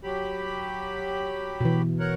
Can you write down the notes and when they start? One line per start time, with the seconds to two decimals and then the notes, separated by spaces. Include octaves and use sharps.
0.03 F#3 G4 B5
1.61 B2 E3
2.00 A#4 C#5 F#5